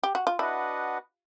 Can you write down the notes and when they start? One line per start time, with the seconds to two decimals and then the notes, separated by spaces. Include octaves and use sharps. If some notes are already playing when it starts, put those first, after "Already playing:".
0.03 G4
0.15 F#4
0.27 F4
0.39 D4 E4 F#4 B4 D#5 F#5